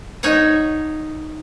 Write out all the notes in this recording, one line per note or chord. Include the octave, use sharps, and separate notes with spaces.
D#4 C#5 E5 F#5